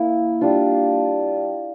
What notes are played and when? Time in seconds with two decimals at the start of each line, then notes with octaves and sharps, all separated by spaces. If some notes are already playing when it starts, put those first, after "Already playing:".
Already playing: A#3 E4
0.41 G3 D4 F4